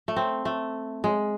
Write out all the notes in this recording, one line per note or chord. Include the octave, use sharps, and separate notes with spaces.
A3
C4
A3
G#3